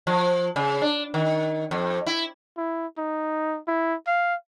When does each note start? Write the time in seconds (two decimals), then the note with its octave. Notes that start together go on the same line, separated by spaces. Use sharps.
0.07 F3
0.56 C#3
0.82 D4
1.14 D#3
1.71 F2
2.06 E4
2.57 E4
2.98 D#4
3.68 E4
4.07 F5